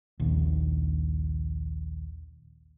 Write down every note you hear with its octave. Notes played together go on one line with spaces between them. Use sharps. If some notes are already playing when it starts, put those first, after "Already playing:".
A#1 D#2